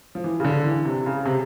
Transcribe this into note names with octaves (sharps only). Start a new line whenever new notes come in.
F3
E3
C#3
D3
E3
C3
C#3
C3